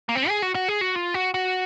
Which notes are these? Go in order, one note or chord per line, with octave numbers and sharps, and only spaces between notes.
A#3
C4
G#4
F#4
F#4
G#4
F#4
F4
F#4
F#4